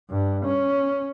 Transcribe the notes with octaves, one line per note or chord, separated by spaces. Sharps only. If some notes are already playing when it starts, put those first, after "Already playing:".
G2
C#4